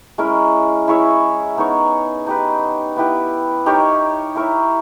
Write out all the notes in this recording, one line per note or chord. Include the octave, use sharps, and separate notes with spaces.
G#3 C#4 E4 A#4
E4 G#4 C#5 E5
B3 D#4 A#4 C#5
D#4 G4 B4
B3 E4 G4 B4
D#4 G4 A#4 C#5
E4 A#4 C#5 E5